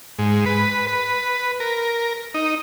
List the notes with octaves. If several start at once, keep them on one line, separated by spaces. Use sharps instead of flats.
G#2
B4
B4
A#4
D#4